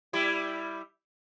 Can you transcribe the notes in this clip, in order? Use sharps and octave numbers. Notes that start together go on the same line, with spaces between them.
G3 E4 G4